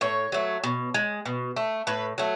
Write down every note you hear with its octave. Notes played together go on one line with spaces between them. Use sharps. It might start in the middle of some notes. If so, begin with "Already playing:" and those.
A2 C#5
F#3 A3
B2
G#3
B2
A3
A2 B4
F#3 A3